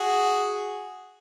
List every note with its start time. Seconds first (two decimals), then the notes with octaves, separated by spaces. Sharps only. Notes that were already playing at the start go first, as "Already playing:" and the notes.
Already playing: F#4 G#4